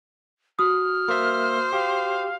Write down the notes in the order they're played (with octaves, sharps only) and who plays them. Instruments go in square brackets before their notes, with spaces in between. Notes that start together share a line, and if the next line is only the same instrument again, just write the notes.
[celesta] F#4 D#6 [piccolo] F6
[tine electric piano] A#3 E5 [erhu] C5
[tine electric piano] G4 [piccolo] F5